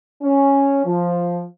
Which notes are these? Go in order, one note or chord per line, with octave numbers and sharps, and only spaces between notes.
C#4
F3